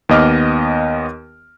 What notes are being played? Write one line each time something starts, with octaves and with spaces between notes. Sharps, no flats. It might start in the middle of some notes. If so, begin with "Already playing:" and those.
D#2 B3 D#5 D6 F6